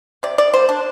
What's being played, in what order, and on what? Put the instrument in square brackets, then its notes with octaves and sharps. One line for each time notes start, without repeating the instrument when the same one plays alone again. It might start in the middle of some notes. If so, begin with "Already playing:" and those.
[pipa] C3 D5
D5
G3 A#3 C5
D4